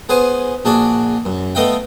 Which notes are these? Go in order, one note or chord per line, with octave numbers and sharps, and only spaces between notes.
B3 G#4 B4 C5 G#5
A#1 D4 F#4 G#4 D5
F#2
A3 B3 D#5 F5 G5